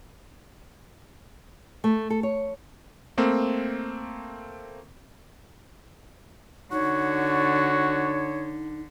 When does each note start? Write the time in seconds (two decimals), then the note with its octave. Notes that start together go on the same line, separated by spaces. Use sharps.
1.84 A3
2.10 A4
2.23 C#5
3.18 A3 A#3 C4
6.71 D3 D#4 F#4 C#5